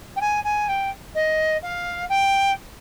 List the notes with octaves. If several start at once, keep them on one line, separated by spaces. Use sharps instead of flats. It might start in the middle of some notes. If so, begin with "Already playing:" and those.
G5
G#5
G#5
G5
D#5
F5
G5